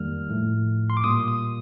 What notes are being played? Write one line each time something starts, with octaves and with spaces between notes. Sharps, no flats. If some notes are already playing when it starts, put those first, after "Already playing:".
Already playing: F2 D#3 G3 A#3 F6
A2 F3 A3
C6
D6
A#2 G3 A#3 D#6
D#6